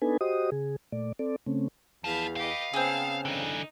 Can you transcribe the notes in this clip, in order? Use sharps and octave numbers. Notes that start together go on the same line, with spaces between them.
B3 D4 D#4 A4 B4 G#5
F#4 G4 C5 D#5 D#6
C#3 G#4
A#2 A3 D5
C4 A4 D5
C#3 A3 C4 C#4
E2 F3 F5 B5
G4 B4 D#5 F5
C#3 B3 C4 G#4 A5 F6
D3 E3 D#4